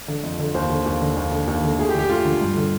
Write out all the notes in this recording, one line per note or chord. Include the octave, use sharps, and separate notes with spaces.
D3
F2
D3
D#2 C5
D3
D#2
D3
D#2
D3
D#2
D3
D2 G#4
G4
D3
G4
D2 F4
D3
G2
D3